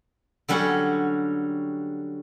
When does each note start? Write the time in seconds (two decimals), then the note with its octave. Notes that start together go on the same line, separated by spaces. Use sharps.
0.49 D3 F#3 G3 C#4